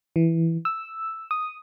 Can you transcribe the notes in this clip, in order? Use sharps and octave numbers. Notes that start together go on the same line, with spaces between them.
E3
E6
D#6